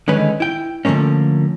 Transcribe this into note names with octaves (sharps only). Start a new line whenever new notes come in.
D3 D#3 G#3 C#4 B4 C#5
E4 G5
D3 F3 A3 A#3 C#4